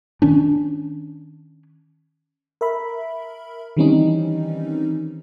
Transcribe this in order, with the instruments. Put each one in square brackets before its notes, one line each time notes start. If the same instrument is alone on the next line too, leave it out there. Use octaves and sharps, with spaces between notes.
[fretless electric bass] D#3 C#4 D4
[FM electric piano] A#4 E5 B5
D#3 E3 G3 C4 C#4 D#4